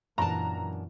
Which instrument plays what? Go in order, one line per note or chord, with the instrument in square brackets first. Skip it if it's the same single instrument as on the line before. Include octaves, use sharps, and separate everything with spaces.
[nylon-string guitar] F#2 D4 A5 [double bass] A#2 E3 [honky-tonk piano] A#5